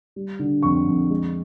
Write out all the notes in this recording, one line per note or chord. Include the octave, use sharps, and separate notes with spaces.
G3
D3
F2 C#6
F2
G#3